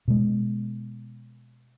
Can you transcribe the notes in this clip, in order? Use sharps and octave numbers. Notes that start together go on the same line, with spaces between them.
B2 G#3